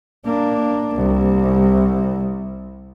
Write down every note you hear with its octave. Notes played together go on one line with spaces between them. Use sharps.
A#3 D4
C2